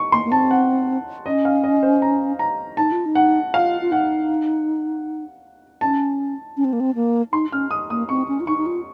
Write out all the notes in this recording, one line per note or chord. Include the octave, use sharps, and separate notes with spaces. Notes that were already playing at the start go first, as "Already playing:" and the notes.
Already playing: C#6
A#3 C6
A#3
C4 A5
F#5
C#4 D#5
F5
D#5
C5
A#5
A#5
D#4 A5
F4
D#4
F#5
F4 F5
F4
D#4 F#5
C#4 A5
C#4
C4
A#3
C4
A#3
D#4 C6
C#4 F6
D#6
A#3 D#6
C4 C#6
C#4
F4
D#4 C#6
D#4
F4